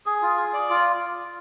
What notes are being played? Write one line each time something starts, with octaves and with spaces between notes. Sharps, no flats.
G#4
F4
G#4
D5
F4